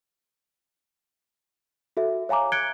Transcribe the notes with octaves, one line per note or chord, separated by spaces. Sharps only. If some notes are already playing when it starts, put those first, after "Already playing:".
F#4 A4 E5
C#5 F5 G#5 A#5 D6
F#6 G#6 C#7 D7 G7